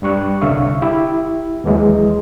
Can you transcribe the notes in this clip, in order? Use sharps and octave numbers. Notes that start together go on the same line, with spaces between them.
G2 G3 C#6 F#6
C2 D3 C#4 E5 F5 C#6
E4 G4
D#2 E3 F#3 G#3